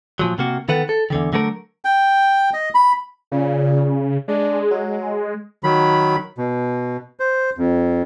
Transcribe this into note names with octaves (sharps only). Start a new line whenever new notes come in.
A#2 F3 F#3
C3 A#3 F#4
D#3 B3 A4 F#5
A4
E2 D3 D#3
D3 F#3 A3 A#4
G5
D#5
B5
A#2 C#3
G#3 D4
F#3
D#3 F#3 B5
B2
C5
F2